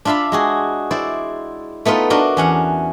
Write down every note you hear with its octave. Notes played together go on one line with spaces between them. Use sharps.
D4 F4 E5 F5 B5
G#3 F#4 G#4
E4 C5 D5
A3 B3 D#4 F4 B4
D4 F#4 A#4 D#5 C6
E2 C#4 F#5